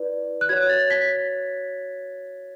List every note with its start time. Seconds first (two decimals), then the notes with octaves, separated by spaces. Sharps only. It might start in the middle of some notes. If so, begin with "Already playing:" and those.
Already playing: E4 B4 D5
0.41 F#6
0.49 F#4 C#5 G#6
0.69 A6
0.90 B6